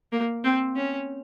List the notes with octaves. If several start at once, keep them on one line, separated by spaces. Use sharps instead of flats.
A#3
C4
C#4